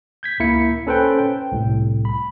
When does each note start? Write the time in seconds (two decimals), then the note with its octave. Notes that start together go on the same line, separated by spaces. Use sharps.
0.23 G6 G#6 B6
0.40 C#2 A#3 E4 A#4 B6 C#7
0.87 C#4 A4 B4 C5 G5
1.19 G5
1.52 C2 A2
2.05 B5